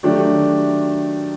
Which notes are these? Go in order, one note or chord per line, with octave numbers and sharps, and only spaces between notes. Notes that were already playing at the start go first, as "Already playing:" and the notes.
D#3 F#3 A3 D4 G4